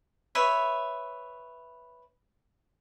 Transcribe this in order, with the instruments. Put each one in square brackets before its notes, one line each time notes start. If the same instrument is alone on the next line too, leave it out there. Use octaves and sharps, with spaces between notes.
[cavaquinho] B4 C#5 E5